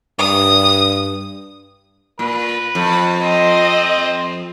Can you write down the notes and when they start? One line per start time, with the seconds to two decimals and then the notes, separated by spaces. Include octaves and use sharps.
0.19 G2 D#6
2.19 A#2 B4
2.75 F2
3.23 C4 D#5